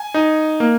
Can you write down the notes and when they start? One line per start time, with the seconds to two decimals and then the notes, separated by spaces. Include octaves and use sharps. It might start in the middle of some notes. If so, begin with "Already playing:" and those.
Already playing: G#5
0.14 D#4
0.60 A#3